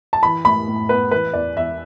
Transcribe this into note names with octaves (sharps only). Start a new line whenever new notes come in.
A5
E3 B5
A2 B5
A2
B3 B4
E3 B4
E2 D5
E2 E5